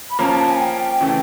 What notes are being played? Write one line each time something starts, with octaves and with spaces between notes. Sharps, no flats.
B5
F3 A#3 C#4 A#5
A5
A5
G#5
G5
C#3 E3 A3